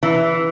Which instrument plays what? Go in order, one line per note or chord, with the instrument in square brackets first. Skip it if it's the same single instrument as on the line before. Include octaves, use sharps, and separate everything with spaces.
[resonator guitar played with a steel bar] E3